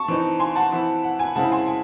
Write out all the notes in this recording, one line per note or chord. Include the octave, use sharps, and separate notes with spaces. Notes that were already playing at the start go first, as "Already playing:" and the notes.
Already playing: A5 C#6
E3 C4 D#4
G#5 C6
F#5 A5
E3 C4 E4
F#5
G#5
C#3 G#3 C4 E4 F#5 A5
G#5 C6
G#5